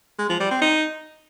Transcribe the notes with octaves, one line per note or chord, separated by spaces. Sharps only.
G#3
F3
G3
C4
D#4